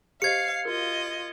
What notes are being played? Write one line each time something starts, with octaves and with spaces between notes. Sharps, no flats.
G4 C5 D#5 F5 G#6 C7 C#7
F4 F#4 A#4 D#5